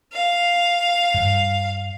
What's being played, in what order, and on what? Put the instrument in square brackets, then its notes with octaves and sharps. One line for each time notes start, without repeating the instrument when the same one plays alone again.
[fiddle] F5
[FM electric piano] G2